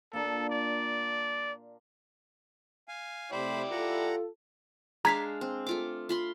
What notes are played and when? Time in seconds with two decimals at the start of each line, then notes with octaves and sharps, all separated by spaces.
0.13 A#2 D4 A4 A#4
0.50 D5
2.88 F5 G#5
3.32 C3 A3 E4 G4 C5 D5 B5
3.71 F4 A4 F#5 A#5
5.05 G#3 D4 F5 A#5 G#6 B6
5.41 C4
5.67 A3 F4 D6
6.09 F4 B5 C6